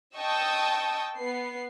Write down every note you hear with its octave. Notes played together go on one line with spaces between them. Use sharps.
D#5 G5 A5 C#6 D#6 E6
B3 C7